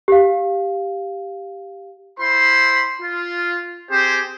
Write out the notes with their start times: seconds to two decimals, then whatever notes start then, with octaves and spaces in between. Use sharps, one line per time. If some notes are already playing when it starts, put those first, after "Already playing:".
0.08 G4 F5
2.19 E4 C5 B5 C6
3.01 F4
3.91 C4 G4 G#4 C5